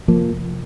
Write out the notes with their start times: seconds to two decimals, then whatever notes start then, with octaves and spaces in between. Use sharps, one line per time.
0.08 F1 F3 A#3